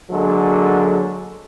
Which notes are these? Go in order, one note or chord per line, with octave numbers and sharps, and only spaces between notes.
D3 F#3 G#3 A#3 A4